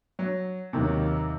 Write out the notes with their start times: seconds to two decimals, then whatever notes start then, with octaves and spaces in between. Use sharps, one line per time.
0.19 F#3
0.73 D#2 C3 D#3 F#3